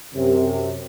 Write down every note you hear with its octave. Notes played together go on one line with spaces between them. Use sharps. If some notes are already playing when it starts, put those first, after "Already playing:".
F#2 C3